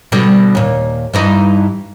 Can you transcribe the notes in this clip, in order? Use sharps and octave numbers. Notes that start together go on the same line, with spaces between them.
B2 D3 G3
D#2 A#2
G2 E3 D#4